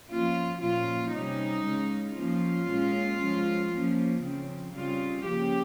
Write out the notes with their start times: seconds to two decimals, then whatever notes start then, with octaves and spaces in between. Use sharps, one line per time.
0.09 F3 A#3 C#4 F4
0.60 A#2 F3 A#3 C#4 F4
1.12 C3 G3 C#4 D#4
1.64 C#3 G#3 C#4
2.16 F3 A#3 C#4 F4
2.68 A#2 G#3 C#4
3.19 F3 G#3 C#4
3.71 F3 A#3 C#4
4.22 C#3 F3 C4
4.75 C#3 G3 C4 F4
5.26 C#3 F3 A#3 G4